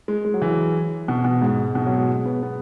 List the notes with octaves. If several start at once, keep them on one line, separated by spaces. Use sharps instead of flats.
G#3
G#3
F#3
E3
B2
B2
G#2
B2
F#3
G#3
G#3
B3
B3